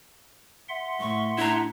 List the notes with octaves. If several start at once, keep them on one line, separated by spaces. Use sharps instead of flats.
E5 F#5 C6
A2 C#6
D4 E4 A#5